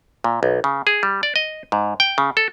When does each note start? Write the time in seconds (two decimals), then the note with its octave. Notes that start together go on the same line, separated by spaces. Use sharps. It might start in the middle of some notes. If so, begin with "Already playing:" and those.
0.24 A#2
0.43 B1
0.64 C#3
0.87 G#4
1.03 G3
1.23 D5
1.36 D#5
1.72 G#2
2.00 G5
2.18 C#3
2.37 A4